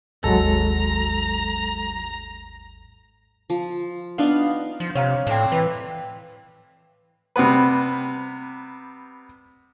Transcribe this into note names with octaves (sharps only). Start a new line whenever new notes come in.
G#1 D#2 F#3 G#3 A4 A#5
F3
B3 D4 D#4 F5
F3
C3 C#5 F5 A#5
A2 C4 D4
E3 B4
C3 G3 B3 B4